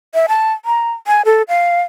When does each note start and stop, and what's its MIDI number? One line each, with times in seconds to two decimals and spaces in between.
0.14 0.26 76
0.29 0.53 81
0.65 0.92 82
1.07 1.22 80
1.25 1.42 69
1.49 1.81 77